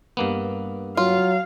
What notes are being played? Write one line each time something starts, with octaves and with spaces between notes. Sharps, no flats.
G2 A#3 B3
F#3 F4 F5